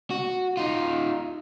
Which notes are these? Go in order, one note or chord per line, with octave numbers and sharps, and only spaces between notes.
F#4
D#4 F4